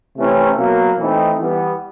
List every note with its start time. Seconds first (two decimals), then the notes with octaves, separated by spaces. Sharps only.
0.17 C3 E3 A3 C#4
0.58 B2 F#3 A#3
0.99 E3 A3 C4 D#4
1.39 E3 G3 B3